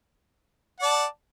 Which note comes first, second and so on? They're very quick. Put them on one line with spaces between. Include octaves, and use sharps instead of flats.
F#5 D5 A5